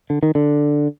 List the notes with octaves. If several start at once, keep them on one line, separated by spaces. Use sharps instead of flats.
D3
D#3
D3